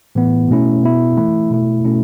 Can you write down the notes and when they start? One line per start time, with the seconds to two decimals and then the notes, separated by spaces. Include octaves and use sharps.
0.15 A2 E3 B3
0.49 B2 A3 C#4 E4
0.83 B2 B3 E4
1.17 E3 A3 E4
1.51 B2 A3 E4
1.85 B2 A3 C#4 E4